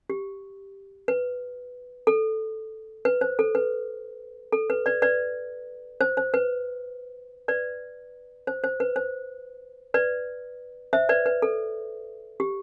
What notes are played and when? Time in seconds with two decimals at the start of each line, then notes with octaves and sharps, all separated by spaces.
0.10 G4
1.08 B4
2.07 A4
3.05 B4
3.21 C5
3.39 A4
3.55 B4
4.53 A4
4.70 B4
4.86 B4 D5
5.02 B4 D5
6.01 C5
6.17 C5
6.34 B4
7.48 B4 D5
8.47 C5
8.64 C5
8.80 B4
8.96 C5
9.94 B4 D5
10.93 C5 E5
11.09 B4 D5
11.26 B4
11.42 A4
12.40 G4